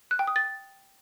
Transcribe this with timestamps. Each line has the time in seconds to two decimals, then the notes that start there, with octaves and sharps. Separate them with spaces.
0.11 F#6
0.19 G5
0.27 D#6
0.36 A6